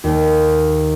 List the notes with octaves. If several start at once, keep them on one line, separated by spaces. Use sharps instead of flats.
D#2